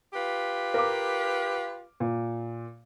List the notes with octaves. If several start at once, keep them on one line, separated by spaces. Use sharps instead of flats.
F4 G4 B4
A#4 F5 D6
A#2